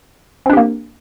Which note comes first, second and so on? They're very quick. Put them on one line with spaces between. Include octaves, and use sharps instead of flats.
C4 D4 G4 A#3